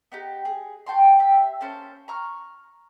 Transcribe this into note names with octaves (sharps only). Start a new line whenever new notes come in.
B3 D#4 G4
G#4
F#4 G5 A5 C6
G4 E5
A#3 C#4 C5 A5
A#5 C#6 F6